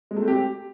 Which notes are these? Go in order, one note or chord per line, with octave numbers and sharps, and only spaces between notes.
G#3
A3
C4
G4